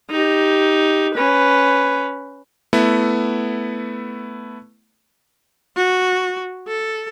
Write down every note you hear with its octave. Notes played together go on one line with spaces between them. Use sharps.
D#4 G4
C#4 B4
A3 B3 E4
F#4
A4